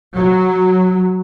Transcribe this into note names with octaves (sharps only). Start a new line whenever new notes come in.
F#3